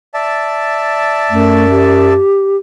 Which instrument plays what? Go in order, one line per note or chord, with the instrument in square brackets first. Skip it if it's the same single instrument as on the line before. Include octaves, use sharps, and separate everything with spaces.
[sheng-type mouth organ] D5 E5 A5
[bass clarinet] F#2 [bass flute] A3
[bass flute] G4